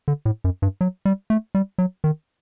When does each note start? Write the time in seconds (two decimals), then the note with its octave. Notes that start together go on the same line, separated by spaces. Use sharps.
0.08 D3
0.25 A2
0.44 F#2
0.62 G2
0.81 F#3
1.05 G3
1.30 A3
1.55 G3
1.78 F#3
2.04 D#3